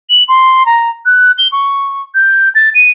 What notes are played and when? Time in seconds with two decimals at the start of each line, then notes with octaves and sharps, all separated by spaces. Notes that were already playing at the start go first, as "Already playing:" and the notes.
0.10 F#7
0.29 C6
0.66 A#5
1.06 F#6
1.38 G7
1.52 C#6
2.15 G6
2.55 A6
2.75 D#7